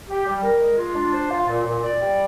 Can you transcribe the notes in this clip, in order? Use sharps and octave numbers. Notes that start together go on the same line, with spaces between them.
G4
G3
A#4
G#3
F4
D4
C5
F4
A#2
A#2
D5
G3